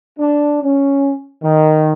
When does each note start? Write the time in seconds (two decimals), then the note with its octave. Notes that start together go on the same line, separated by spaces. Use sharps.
0.19 D4
0.62 C#4
1.43 D#3